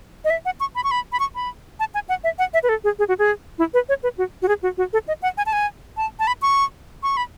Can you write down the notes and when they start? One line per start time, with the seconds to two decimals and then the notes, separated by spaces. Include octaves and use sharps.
0.25 D#5
0.30 E5
0.45 F#5
0.60 C#6
0.76 B5
0.84 C#6
0.91 B5
1.12 B5
1.20 C#6
1.35 B5
1.80 A5
1.94 G#5
2.09 F#5
2.24 E5
2.39 F#5
2.54 E5
2.63 B4
2.69 A4
2.84 G#4
2.99 G#4
3.08 F#4
3.19 G#4
3.58 E4
3.74 B4
3.89 C#5
4.03 B4
4.18 F#4
4.42 F#4
4.48 G#4
4.63 F#4
4.78 F#4
4.93 A4
5.08 D#5
5.22 F#5
5.37 G#5
5.46 A5
5.53 G#5
5.97 A5
6.19 A5
6.27 B5
6.42 C#6
7.03 C#6
7.17 B5